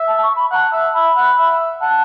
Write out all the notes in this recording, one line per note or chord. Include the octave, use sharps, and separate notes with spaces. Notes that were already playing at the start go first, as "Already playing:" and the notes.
Already playing: E5
A5
C#6
B5
F#5 A5 B5
E5
E5 B5
F#5
E5
F#5 A5